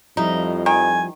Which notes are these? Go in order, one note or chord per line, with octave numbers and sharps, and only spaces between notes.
F2 F3 G3 D#4 E4
D#3 G#5